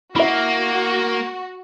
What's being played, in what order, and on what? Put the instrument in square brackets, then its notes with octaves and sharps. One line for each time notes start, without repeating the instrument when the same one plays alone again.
[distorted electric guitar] A#3 [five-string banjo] E4 E5 [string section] F#4